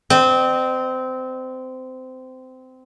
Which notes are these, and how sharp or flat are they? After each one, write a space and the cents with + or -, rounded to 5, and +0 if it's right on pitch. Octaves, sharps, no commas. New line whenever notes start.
C4 -20 D#5 -45